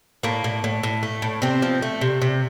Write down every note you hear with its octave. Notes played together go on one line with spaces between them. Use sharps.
A2 A#3
A2
A2
A2
A3
A2
C3 C4
F3
A3
C3
C3